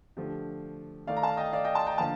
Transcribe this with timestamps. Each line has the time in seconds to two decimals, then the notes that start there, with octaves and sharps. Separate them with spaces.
0.17 D3 F3 A3 G4
1.07 D#3 A3 D#4 D5 F5
1.16 A#5
1.22 F5 A5
1.37 D#5 G5
1.53 D5 F5
1.64 D#5 G5
1.75 A5 C6
1.87 G5 A#5
1.98 D3 F3 A#3 F5 A5